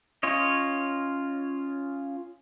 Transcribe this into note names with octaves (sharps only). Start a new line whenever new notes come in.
C#4 F4 C#5 D#5